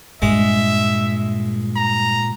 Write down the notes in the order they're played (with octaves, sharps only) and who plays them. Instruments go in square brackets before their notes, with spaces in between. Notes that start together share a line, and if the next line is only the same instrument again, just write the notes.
[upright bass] G2 [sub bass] A#2 [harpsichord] G#3 [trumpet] E5
[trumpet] A#5